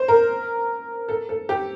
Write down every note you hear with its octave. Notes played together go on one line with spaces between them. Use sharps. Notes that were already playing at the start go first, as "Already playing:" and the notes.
Already playing: C5
A#4
A4
A4
G4